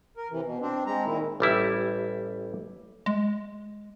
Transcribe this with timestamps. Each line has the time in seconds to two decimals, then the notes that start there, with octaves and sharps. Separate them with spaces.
0.17 A#4
0.31 C3 E3
0.45 B2
0.62 C4 D4
0.86 G#3 C4 A#5
1.05 A#2 D#3 E4
1.40 A1 G3 E4
3.06 G#3